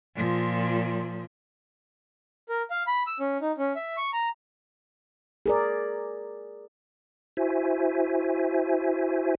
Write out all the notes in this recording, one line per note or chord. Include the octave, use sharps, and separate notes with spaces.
A#2 F3
A#4
F5
B5
E6
C#4
D#4
C#4
E5
C#6
A#5
G#4 A#4 D5
E4 F#4 C5 E5 G#5